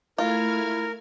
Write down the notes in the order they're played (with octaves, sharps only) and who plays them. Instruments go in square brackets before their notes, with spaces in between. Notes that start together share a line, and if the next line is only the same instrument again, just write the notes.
[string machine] A3 F6 G#6 [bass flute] E4 [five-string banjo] F4 [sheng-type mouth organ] A#4